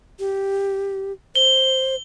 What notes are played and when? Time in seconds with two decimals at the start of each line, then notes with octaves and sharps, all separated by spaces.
0.19 G4
1.35 C5 G7